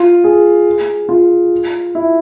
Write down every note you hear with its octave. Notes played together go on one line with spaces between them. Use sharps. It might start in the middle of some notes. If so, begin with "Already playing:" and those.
Already playing: F4
G#4
F4
E4